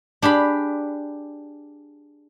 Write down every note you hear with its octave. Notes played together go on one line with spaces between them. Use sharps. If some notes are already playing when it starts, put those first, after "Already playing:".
D4 G4 G#4 B5